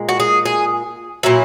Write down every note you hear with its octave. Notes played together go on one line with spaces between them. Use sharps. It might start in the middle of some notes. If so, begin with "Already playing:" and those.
Already playing: A#2 G#3
F#4
G#4
G#4
A#2 F#3 E4